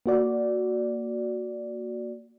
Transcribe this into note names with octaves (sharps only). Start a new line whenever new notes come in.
A#3 F#4 D5